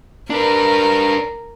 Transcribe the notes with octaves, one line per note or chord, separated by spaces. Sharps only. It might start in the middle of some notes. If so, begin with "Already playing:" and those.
D4 A#4 B4